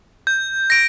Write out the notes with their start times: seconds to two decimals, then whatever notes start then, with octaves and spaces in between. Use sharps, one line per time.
0.27 G6
0.70 A#6 D7